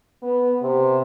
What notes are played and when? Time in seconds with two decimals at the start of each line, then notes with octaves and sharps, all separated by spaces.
0.23 B3
0.62 C3